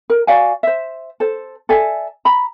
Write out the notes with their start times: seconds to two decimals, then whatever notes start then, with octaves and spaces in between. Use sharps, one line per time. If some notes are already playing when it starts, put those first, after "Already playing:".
0.10 A#4
0.27 F#4 D5 F5 G#5
0.63 C5 E5
1.20 A4 C5
1.69 A4 D5 E5 G#5
2.25 A#5 B5